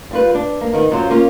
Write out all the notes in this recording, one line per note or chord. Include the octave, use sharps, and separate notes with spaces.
G3 F4 B4
D4
A#3
D#3 B3
F#2 F#3 F4 C5
A#3 C#4 F4